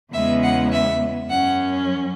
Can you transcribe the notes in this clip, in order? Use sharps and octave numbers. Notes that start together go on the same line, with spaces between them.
E2 C#3 G#3 B3 E5
F#5
E5
F#2 F#3 C#4 F#5